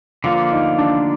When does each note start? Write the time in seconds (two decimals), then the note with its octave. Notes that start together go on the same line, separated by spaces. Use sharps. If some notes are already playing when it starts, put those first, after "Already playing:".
0.24 D3 F3 A#3 F4
0.52 D#4
0.78 D4